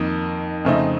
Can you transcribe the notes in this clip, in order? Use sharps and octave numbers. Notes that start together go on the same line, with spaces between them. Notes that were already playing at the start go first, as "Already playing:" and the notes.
Already playing: F2 D#3 A#3 D#4
F2 C#3 A3 C4 D#4